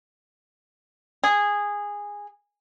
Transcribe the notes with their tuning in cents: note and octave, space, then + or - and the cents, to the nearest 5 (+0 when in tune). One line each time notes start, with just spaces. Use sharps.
G#4 -15